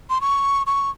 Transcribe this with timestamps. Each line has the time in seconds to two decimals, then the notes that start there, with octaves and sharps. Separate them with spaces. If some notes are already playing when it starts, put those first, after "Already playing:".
0.10 C6
0.21 C#6
0.67 C#6